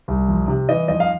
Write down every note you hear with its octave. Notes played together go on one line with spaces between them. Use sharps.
C2
F2
C3
E3 D#5
F2 D#5
F5